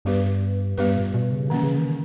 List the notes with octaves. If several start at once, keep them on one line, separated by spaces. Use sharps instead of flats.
G2 G3 B3 G4 B4
G2 G3 B3 G4 B4
A#2
B2
C#3
D#3 E3 A#3 C#4
C#3
D#3